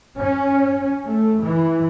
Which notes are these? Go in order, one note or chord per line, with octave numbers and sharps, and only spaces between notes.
C#4
A3
E3